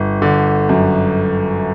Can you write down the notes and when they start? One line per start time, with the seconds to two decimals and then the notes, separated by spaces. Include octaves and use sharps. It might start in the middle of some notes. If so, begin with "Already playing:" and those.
Already playing: G1
0.22 D3
0.69 F#2